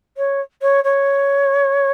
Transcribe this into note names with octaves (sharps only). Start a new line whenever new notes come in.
C#5
C#5
C#5